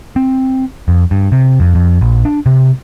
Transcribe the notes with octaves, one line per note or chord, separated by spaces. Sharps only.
C4
F2
G2
C3
F2
F2
A#1
D4
C3